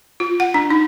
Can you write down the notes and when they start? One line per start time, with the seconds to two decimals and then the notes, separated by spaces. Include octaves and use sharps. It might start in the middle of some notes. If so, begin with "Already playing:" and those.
0.20 F4
0.40 F#5
0.54 D4
0.70 D#4